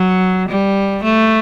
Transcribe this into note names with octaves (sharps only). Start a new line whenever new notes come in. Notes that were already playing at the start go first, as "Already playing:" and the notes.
Already playing: F#3
G3
A3